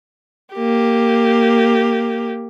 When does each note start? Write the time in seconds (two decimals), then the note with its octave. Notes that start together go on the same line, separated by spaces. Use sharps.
0.54 A#3 G4